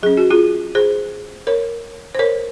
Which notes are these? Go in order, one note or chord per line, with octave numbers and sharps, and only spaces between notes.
F#3 C#4 G#4
F#4
F4 G#4
G#4 C5
A#4 C#5
C5
A#4 C#5